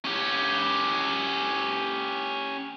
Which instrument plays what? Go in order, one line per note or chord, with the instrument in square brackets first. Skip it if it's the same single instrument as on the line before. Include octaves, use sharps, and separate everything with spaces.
[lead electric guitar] C#4 G4